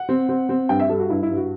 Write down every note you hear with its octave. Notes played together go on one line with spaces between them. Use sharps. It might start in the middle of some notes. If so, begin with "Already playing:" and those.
Already playing: F#5
C4
C4
C4
G2 G5
E5
G3 A4
F#4
G2 E4
E4
G2
F#4